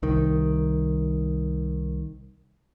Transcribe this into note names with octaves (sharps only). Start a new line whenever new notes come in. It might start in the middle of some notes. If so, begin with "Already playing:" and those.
C2 D#3